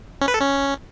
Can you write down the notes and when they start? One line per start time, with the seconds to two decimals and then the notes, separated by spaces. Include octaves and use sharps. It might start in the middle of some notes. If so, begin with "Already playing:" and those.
0.22 C#4
0.28 B4
0.34 A4
0.40 C#4